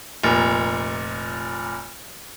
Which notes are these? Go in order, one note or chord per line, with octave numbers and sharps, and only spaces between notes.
F1 A#2